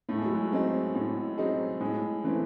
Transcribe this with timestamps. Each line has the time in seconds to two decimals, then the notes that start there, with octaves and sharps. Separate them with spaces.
0.09 A2 A3
0.18 G#3
0.26 F#3
0.35 G#3
0.52 F#3 C4 D#4 G#4
0.95 A2
1.38 F#3 C4 D#4 G#4
1.80 A2 G#3
2.24 E3 A3 C4